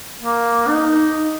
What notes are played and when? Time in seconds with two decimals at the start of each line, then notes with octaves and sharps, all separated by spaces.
0.21 A#3
0.68 D#4